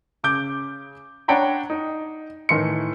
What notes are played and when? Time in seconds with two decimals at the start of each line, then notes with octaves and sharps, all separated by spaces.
0.23 C#3 D6 G6
1.28 D4 C#5 F#5 G5 A#5 B5
1.70 D#4
2.49 A2 D#3 E3 A3 C6 C#7